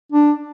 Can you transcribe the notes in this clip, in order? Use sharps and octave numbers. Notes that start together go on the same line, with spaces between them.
D4